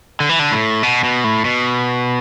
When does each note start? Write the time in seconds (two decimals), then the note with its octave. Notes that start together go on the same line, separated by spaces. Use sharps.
0.20 D3
0.29 E3
0.39 D3
0.52 A2
0.83 B2
1.04 B2
1.24 A2
1.45 B2